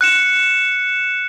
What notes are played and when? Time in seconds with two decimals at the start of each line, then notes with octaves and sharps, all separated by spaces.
0.01 F#6 C#7 E7